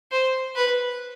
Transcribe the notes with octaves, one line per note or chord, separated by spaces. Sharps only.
C5
B4